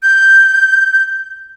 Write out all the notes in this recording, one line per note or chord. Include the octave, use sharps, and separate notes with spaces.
G6